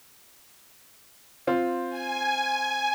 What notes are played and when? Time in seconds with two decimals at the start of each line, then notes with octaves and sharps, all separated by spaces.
1.47 C4 F4
1.89 G#5